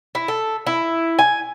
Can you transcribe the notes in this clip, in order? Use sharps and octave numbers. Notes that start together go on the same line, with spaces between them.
E4
A4
E4
G#5